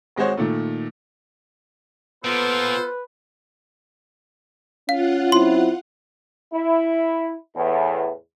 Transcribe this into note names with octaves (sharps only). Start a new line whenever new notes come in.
G#1 G#3 F#4 C5 C#5
A#2 D#3 A3
A#2 B3 F4 A4 B4 C5
C#4 F4 F5 F#5
F#3 C4 E4 C6
E4
E2 A2